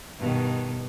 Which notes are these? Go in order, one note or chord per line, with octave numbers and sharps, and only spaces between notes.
G2 B2 D#3